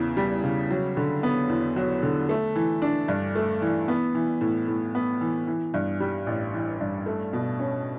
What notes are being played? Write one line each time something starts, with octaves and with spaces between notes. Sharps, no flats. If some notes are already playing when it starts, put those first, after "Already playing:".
Already playing: E2 C#3 B3
G3
C#3
F#3
D3
B3
E2
F#3
D3
A3
E3
D4
G2
A3
E3
B3
E3
A2
A2
B3
E3
E3
G2
G3
A1
E3
G2
A3
B2
C#4